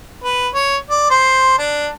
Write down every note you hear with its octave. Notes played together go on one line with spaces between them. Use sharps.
B4
C#5
D5
C5
D4